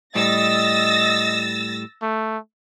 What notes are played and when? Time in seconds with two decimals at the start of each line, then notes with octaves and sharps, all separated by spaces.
0.15 A2 G3 D#5 E6 A6 A#6
2.03 A3